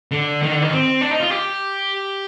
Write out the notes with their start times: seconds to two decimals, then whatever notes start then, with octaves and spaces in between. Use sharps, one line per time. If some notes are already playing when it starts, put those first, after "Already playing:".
0.12 D3
0.42 D#3
0.52 D3
0.62 D#3
0.71 C4
1.01 D4
1.11 D#4
1.20 F4
1.30 G4